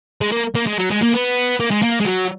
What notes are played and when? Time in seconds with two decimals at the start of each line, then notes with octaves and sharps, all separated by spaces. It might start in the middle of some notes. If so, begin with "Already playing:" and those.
0.21 G#3
0.32 A#3
0.55 A#3
0.66 G#3
0.78 F#3
0.90 G#3
1.02 A#3
1.13 B3
1.60 A#3
1.71 G#3
1.82 A#3
2.00 G#3
2.05 F#3